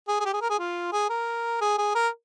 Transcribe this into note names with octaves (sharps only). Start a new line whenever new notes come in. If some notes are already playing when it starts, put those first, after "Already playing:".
G#4
G#4
G4
G#4
A#4
G#4
F4
G#4
A#4
G#4
G#4
A#4